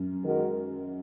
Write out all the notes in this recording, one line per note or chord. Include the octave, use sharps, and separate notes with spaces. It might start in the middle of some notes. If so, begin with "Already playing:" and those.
Already playing: F#2
D#3 G#3 F#4 A#4